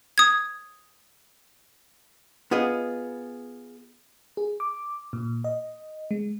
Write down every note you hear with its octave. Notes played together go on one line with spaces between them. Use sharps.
D#6 G#6
B3 F4 G#4 D#5
G#4
D6
A#2
D#5
G#3